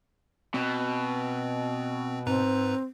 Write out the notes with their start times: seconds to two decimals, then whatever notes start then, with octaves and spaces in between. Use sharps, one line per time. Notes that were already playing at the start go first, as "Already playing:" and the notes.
0.54 B2 C4
2.27 G#2 C4 B4 A#5